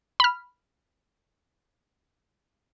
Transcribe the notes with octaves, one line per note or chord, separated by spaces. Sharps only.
B5 F6